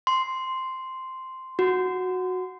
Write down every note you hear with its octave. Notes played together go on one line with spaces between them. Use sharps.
C6
F#4